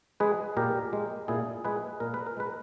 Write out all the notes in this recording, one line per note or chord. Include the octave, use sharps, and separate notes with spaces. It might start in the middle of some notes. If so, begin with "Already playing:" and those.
G#3 G#4 B4
A#2 G4 A#4
G#3
A#2 E4 G#4
G#3 G#4 B4
A#2 A#4
B4
A#4
G#3 B4